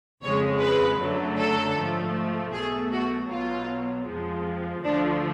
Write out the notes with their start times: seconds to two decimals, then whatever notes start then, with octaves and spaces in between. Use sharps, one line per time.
0.23 F2 C#3 G#3 C#5
0.61 B4
0.99 F#2 D3 F#3 A3
1.38 A4
1.76 G#2 F3 A3
2.53 B1 B2 A3 G#4
2.92 F#4
3.30 B1 B2 F#3 F4
4.07 F2 F3 G#3
4.84 D2 D3 F3 A3 D4